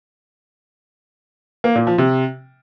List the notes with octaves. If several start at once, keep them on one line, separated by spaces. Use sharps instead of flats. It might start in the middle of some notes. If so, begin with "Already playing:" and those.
A#3
A#2
F3
C3